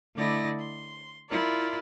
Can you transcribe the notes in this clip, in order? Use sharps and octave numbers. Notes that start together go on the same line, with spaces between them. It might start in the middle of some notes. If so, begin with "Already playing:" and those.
D3 A3 E4 D5 D#5 A#6
C6
E4 F4 A#4 D5